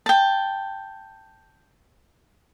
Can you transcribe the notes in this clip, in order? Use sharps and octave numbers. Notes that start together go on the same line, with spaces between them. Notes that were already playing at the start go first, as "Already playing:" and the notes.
G5 A5